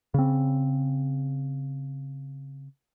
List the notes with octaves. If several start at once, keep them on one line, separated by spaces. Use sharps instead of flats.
C#3 C4